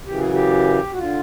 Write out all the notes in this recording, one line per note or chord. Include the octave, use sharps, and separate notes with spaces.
F#2 C#3 E3 G4
G#4
G4
F#4
D3 F4